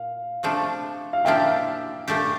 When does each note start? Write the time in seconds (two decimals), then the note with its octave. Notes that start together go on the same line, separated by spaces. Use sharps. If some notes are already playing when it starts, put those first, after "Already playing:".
Already playing: A#2 F5
0.43 C3 F3 A3 D4
1.13 F5
1.25 A#2 F3 A#3 D4 G4 E5 G5
2.08 A#2 A3 D4 G4